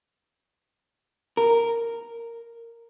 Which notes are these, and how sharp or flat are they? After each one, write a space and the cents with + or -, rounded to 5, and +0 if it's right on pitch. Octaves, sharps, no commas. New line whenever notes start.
A#4 -5